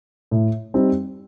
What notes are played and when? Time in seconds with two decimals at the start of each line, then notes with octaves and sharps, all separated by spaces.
0.31 A2
0.74 G3 C4 D#4